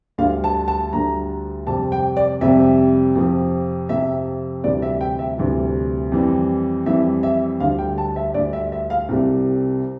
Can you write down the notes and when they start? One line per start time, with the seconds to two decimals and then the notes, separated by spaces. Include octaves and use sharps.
0.18 D2 D3 G3 F5
0.44 A5
0.68 A5
0.93 D2 D3 G3 A#5
1.67 F2 C3 G3 A5
1.92 G5
2.17 D5
2.41 F2 C3 G3 E5
3.16 F2 C3 F3
3.89 F2 C3 F3 E5
4.64 D2 C3 E3 G3 D5
4.82 E5
5.01 G5
5.19 E5
5.37 D2 C3 E3 G3
6.12 F2 E3 G3
6.86 F2 E3 G3 E5
7.23 E5
7.60 D2 D3 G3 F5
7.79 G5
7.98 A5
8.16 E5
8.34 D2 D3 G3 D5
8.53 E5
8.72 E5
8.90 F5
9.09 C2 C3 G3